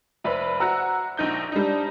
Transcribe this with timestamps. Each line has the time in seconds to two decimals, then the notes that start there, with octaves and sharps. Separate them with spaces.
0.24 F1 B4 C5 D5 E5 B5
0.60 F#4 F#5 A#5 E6
1.17 A#1 D#4 G6
1.52 G3 D4 D#4